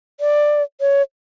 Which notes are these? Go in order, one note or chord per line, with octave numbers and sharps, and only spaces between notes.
D5
C#5